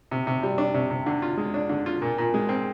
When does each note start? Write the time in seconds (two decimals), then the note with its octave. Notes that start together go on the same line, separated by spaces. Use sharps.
0.11 C3
0.27 C3
0.43 G3
0.58 D4
0.74 C3
0.91 C3
1.06 D3
1.22 F4
1.37 G#3
1.54 D4
1.69 D3
1.86 F4
2.02 A#2
2.18 A#2
2.34 G#3
2.49 C4